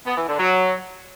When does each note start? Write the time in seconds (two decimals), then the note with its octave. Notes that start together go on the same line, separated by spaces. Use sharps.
0.06 B3
0.17 E3
0.28 D3
0.38 F#3